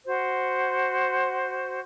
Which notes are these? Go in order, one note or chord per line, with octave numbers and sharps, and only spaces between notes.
F#4 C5